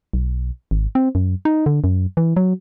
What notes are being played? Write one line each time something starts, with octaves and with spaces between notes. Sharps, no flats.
B1
G#1
C4
F#2
D#4
D3
F#2
E3
F#3